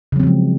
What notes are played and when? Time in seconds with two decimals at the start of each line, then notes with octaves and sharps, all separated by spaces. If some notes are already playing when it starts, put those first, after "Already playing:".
0.12 C#3
0.16 F#3
0.20 C4
0.23 F3
0.27 G#3